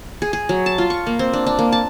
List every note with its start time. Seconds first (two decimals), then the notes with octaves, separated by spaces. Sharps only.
0.22 G#4
0.33 G#4
0.49 F#3
0.66 A5
0.78 F4
0.90 C#6
1.07 A#3
1.19 C4
1.33 D4
1.47 D4
1.59 A#3
1.72 A5